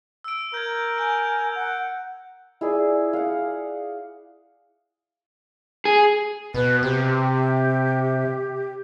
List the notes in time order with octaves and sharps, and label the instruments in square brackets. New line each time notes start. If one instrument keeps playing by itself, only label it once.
[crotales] E6 D7
[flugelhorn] A#4 [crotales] G6 G#6
[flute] G#5 [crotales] G6 D7
[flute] F#5
[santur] E4 G#4 D5
F5 F#5
[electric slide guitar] G#4
[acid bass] B2 [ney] B4
[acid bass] C3 [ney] G4